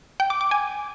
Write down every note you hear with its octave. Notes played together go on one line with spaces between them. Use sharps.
G5
D6
D6
G#5